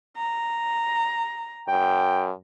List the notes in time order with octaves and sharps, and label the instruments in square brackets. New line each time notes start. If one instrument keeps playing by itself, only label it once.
[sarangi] A#5
[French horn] F#2 [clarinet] G5